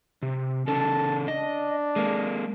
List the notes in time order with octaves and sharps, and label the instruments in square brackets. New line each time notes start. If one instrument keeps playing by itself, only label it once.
[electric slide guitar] C3
[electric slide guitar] C#3 C#4 A4 [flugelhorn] A5
[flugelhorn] D4 [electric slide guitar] D#5
[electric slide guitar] G#3 A#3